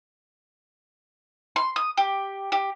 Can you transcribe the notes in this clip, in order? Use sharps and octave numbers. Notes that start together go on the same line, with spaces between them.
C6
D#6
G4
G4